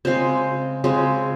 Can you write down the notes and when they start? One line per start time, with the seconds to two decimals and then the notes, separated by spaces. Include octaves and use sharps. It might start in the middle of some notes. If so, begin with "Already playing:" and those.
0.05 C#3 G#3 C4 C5
0.84 C#3 G#3 C4